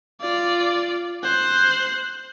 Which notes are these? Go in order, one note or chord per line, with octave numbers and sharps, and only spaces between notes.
F4 D5
C5 F#6